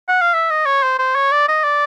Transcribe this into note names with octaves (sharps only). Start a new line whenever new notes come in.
F#5
F5
E5
D#5
C#5
C5
C5
C#5
D5
D#5
D5